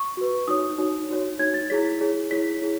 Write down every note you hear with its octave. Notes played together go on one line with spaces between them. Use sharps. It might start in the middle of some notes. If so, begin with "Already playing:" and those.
Already playing: C#6
F#4 B4
D#4 F#4 C#5 D#6
D#4 F#4 C#5
D#4 F#4 C#5
D#4 F#4 C#5 G#6
A6
E4 G#4 C#5 B6
E4 G#4 C#5
E4 G#4 C#5 B6
E4 G#4